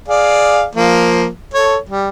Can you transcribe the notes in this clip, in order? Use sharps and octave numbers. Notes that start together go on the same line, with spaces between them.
G#4 D5 F5
F3 A#3
A4 C#5
G3